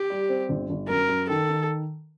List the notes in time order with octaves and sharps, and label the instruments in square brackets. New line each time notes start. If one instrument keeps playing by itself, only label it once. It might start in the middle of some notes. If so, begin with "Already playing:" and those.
Already playing: [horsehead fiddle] G4
[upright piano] G3
C4
G1
G1
[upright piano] F#2 [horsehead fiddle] A#4
[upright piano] F#2
[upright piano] D#3 [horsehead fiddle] A4
[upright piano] D#3